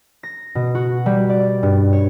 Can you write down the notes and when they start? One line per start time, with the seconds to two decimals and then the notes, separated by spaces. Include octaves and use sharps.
0.23 A#6
0.55 B2
0.75 F#4
1.06 G3
1.29 D5
1.63 G2
1.93 C#5